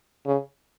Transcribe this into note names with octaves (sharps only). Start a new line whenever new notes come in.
C#3